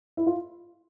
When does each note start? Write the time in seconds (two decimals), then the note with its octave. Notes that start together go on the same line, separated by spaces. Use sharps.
0.17 E4
0.27 F4